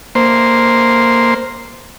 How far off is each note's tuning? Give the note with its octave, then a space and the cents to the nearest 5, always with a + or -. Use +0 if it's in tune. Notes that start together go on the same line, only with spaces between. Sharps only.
A#3 +0 C5 +0